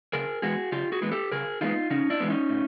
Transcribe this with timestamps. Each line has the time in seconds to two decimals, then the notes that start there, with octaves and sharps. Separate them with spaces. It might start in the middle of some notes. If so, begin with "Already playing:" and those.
0.13 C#3 G#4 A#4
0.42 E3 G#3 B3 F#4 G#4
0.72 C#3 F4 G4
0.92 F#4 G#4
1.02 E3 G#3 B3
1.12 G4 A4
1.32 C#3 G#4 A#4
1.61 E3 G#3 B3 D#4 F4
1.90 C#3 C#4 D#4
2.10 D4 E4
2.20 E3 G#3 B3
2.30 C#4 D#4
2.50 A2